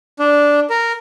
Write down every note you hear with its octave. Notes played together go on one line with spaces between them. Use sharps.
D4
A#4